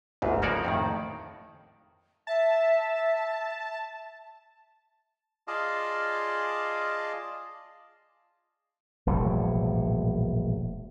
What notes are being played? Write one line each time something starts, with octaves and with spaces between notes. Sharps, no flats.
G1 D2 G#2
C#3 F3 A#3 F#4 C#5 D5
F2 A2 D#3
E5 A5
F4 G#4 D5 D#5 F5 A5
E1 A#1 A2 G3